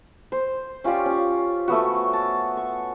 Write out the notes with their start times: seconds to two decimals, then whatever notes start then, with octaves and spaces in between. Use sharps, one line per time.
0.32 C5
0.84 C#4 F4 G4 D5
1.06 C#4
1.68 A3 B3 F#4
2.13 A5
2.57 C#6